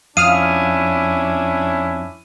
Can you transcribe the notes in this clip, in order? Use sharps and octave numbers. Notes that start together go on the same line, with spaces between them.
F2 C#4 D4 E4 F5 D#6 F6 D#7